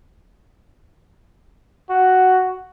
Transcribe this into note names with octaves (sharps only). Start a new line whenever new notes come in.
F#4